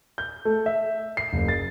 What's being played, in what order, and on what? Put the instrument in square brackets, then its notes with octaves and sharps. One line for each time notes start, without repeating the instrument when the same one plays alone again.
[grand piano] G6
A3
E5
C7
F#1
A6